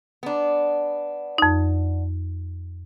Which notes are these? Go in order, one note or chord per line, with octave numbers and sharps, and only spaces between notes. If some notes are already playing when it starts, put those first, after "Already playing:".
B3 D4
F2 D#4